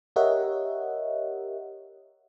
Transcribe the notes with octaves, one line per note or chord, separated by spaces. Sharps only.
G4 A#4 C#5 D#5 E5 F#5